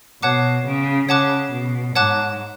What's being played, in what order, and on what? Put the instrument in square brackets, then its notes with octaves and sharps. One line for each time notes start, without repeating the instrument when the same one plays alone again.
[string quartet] B2 [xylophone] C#5 F#5 A5 D6 F#6
[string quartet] C#3
[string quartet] C#3 [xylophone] C#5 F#5 A5 D6 F#6
[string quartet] B2
[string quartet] G#2 [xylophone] C#5 F#5 A5 D6 F#6